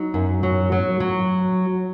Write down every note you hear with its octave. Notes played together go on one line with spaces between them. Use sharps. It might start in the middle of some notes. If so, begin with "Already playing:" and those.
Already playing: F#3 D#4
F#2
F#3
F#3
F#3